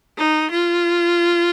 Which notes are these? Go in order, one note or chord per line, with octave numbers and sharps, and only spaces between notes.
D#4
F4